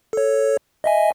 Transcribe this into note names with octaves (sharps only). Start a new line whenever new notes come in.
A4 C#5
D#5 E5 G#5